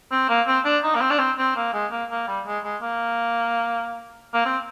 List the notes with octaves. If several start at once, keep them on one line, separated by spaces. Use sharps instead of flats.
C4
A#3
C4
D4
D#4
A#3
C4
D4
C4
C4
A#3
G#3
A#3
A#3
G3
G#3
G#3
A#3
A#3
C4